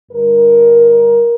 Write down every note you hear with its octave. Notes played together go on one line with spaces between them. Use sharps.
G2 D3 G3 A#4